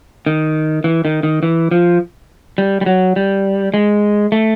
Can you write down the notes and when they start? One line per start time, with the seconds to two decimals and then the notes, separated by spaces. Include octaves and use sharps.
0.26 D#3
0.84 E3
1.05 D#3
1.23 D#3
1.43 E3
1.71 F3
2.58 G3
2.81 G3
2.86 F#3
3.16 G3
3.74 G#3
4.32 A3